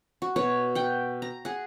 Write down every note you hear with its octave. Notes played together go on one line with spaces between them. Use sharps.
F#4
B2 C#5 F#5
F#5 G5
A#5
G#4 F#5